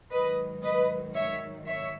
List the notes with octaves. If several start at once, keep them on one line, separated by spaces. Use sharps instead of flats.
G#2 D#3 F#3 B4 D#5
B4 D#5
C#5 E5
C#5 E5